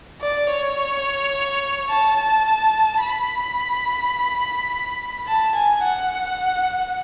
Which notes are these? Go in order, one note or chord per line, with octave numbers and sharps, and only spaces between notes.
D5
C#5
A5
A5
B5
A5
G#5
F#5